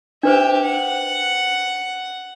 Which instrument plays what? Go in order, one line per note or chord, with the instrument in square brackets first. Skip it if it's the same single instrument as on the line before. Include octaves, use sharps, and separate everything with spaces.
[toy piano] D4 B4 C5 [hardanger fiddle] G4 E5
[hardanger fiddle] F#5